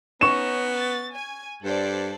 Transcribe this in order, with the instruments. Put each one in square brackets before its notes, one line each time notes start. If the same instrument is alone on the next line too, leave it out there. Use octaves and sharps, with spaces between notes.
[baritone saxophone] B3 [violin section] C#4 D#4 [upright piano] C#6 E7
[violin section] A6
G#5
[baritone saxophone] G2 [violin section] A4 C5 D5